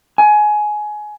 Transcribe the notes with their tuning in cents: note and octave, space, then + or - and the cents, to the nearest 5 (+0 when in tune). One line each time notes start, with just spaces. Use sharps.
G#5 +20